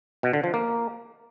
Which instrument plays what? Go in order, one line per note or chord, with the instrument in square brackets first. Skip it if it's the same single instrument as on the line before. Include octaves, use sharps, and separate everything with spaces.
[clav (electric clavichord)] B2
D3
F3
A#3